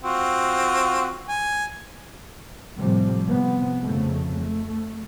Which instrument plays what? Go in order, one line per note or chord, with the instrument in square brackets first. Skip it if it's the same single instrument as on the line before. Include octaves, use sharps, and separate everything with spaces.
[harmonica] C4 F4 F#4
G#5
[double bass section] A2 C3 F3 G3
C3 F3 B3
F2 C#3 A3
A3